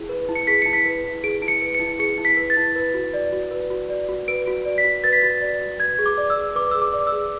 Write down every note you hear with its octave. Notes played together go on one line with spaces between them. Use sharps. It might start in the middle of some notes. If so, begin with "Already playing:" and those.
Already playing: E4 G#4
B4
E4
C#7
G#4 B6
E4 C#7
B6
B4
E4
G#4 D7
E4 D7
C#7
B4
C#7
E4
G#4 C#7
E4
B6
B4
A6
E4
B4
F#4
D5
F#4
B4
F#4
D5
F#4
B4 D7
F#4
D5
B6
F#4
B4 A6
B6
F#4 A6
D5
F#4
B4 G#6
G#4
D6
D5
E6
G#4
B4 D6
G#4 E6
D6
D5
E6
G#4